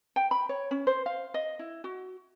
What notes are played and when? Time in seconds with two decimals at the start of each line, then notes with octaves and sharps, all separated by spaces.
0.16 G5
0.31 B5
0.49 C#5
0.71 C#4
0.87 C5
1.06 F5
1.34 D#5
1.59 E4
1.84 F#4